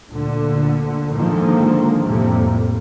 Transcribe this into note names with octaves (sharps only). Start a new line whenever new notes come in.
D2 A#2 D3
G#2 D3 D#3 F3 G#3 A#3
F2 A2 C3 G3 A3 A#3